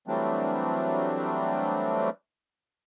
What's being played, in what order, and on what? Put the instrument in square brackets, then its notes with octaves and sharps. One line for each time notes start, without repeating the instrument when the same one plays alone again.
[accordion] E3 F#3 G3 A3 C4 D4